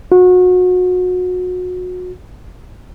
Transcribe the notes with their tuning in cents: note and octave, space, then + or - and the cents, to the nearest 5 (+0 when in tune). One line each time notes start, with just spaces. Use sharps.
F#4 -30